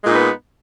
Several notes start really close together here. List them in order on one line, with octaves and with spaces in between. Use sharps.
G#3 A#2 D#4 B3